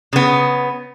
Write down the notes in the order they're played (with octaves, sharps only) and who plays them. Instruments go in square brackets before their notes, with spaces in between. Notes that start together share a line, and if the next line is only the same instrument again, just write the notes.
[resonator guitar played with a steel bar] C#3 B3